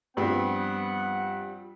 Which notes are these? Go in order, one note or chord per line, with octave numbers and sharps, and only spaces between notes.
G2 F3 G3 B3 C4 F#5